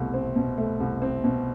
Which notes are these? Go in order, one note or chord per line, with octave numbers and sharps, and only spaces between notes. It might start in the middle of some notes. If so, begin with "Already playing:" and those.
Already playing: C2 B2 A3
C4
B2
A3
C2
C4
B2